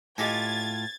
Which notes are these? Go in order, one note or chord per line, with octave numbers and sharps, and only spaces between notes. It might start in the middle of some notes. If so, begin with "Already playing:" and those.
A2 F4 G4 D#5 G#5 G#6 A6